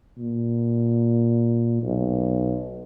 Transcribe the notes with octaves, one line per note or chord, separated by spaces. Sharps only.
A#2
B1